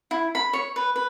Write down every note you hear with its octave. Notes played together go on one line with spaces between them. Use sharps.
E4
B5
C#5
B4
B4